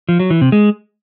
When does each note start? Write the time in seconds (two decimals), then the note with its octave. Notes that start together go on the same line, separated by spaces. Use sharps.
0.09 F3
0.19 F#3
0.30 E3
0.41 C3
0.52 G#3